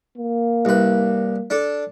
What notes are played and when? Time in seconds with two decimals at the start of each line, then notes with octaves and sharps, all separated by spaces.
0.17 A#3
0.65 C2 B4
1.50 D4 A4